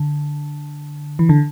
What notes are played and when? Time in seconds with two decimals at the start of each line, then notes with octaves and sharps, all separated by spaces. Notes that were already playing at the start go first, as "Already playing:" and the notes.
Already playing: D3
1.19 E3
1.29 D3